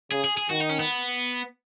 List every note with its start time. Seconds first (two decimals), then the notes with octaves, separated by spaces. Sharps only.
0.12 C#3 G#4
0.24 G#4
0.37 G#4
0.50 D#3 F#4
0.60 D#4
0.69 C#4
0.80 B3